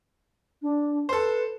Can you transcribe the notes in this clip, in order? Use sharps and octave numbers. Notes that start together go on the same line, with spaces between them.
D4
A4 B4 C5